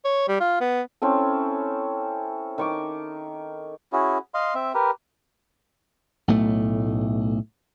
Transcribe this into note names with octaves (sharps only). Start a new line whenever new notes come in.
C#5
G3
F4
B3
C4 C#4 E4 A4
D#3 C#6 D6
C#4 E4 F#4 G#4
D#5 F5 C6
C4 E5
G4 A#4 B4
B1 A2 A3